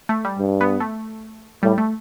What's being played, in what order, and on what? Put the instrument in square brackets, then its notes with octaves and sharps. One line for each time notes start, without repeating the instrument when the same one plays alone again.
[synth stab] A3
G3
[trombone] G2
[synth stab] B3
A3
[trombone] A2 [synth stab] G3
[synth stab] A3